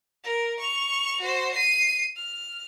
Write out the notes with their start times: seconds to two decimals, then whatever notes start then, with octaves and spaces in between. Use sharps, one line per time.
0.24 A#4
0.60 C#6 F7
1.20 F#4 C5
1.55 C7 D#7
2.16 F6